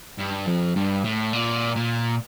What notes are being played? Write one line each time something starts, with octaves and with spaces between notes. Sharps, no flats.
G2
F2
G2
A2
A#2
A#2